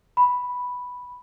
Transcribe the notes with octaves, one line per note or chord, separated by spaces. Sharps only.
B5